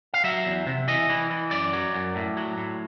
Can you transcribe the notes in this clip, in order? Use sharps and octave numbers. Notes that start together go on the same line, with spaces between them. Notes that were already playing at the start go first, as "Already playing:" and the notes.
F5
F#3 E5
E2
C3
E3 D#5
E3
E3
F#2 D5
F#3
F#2
A2
F#3
A2